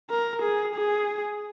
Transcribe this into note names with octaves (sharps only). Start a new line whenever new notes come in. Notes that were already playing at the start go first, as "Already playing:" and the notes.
A#4
G#4
G#4